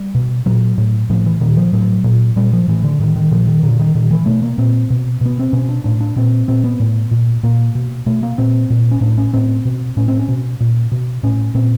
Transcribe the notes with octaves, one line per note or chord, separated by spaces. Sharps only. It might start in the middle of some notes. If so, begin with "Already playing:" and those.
Already playing: G3
B2
A#2 F#3
A2
A2 F3
E3
A#2 D#3
F3
A2 F#3
A#2
A#2 G3
F3
A2 E3
D3
A2 D#3
D#3
A#2 F3
D#3
A#2 D3
D#3
A#2 D#3
E3
B2 A3
A#3
A#2 C4
B2
B2 B3
C4
B2 C#4
D4
A2 D4
D4
A#2 C4
A#2 C4
B3
A2
A#2
A#2 A#3
B2
B2 A3
A#3
A#2 C4
A#2
C#4
A2 D4
C#4
A2 C4
B2
A2 C#4
C4
C#4
B2
A#2
B2
A2 C#4
A#2 C4